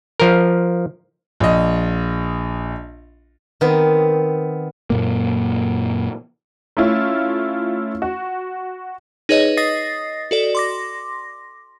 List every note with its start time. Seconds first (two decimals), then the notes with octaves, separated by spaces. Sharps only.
0.20 F3 A#4
1.40 A#1 D#5
3.61 D#3 B3 C4
4.90 F#2 A#2 A#3
6.77 A3 C#4 E4 F4
8.02 F#4
9.29 D#4 G#4 B4 C#5 D#5
9.57 D#5 D#6 A6 A#6 C7
10.31 F#4 A4 D5
10.55 C6 D6 A#6